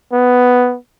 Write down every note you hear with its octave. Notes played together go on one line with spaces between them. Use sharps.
B3